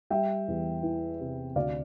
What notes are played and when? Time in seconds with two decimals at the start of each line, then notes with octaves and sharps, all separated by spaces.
0.10 G3 E5 G5
0.48 E2
0.83 E3
1.20 C3
1.56 D2 D5 F5